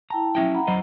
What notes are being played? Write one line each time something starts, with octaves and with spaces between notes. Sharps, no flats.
E4 G5 A5 A#5
F#3 C#4 E4 E5 G5
F#5 A#5 B5
F#3 C5 D#5